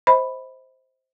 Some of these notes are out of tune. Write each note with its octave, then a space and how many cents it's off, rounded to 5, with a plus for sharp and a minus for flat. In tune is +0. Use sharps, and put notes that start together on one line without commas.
C5 +0 D#5 +45 B5 +0